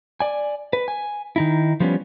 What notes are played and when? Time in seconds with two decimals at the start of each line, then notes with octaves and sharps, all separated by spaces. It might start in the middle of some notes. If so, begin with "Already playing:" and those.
0.20 D5 G#5
0.73 B4
0.88 G#5
1.36 D#3 D#4 E4
1.80 F3 G3 B3 C#4